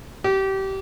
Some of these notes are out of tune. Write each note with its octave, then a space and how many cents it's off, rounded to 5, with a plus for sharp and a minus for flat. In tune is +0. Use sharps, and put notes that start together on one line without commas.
G4 -25